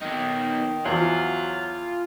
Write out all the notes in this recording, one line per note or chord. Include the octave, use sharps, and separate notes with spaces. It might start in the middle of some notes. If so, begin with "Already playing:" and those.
D#3 B3 D#4
E2 F3 F#3 F4